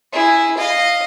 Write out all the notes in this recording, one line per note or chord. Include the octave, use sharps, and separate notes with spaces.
E4 G#4
D#5 F5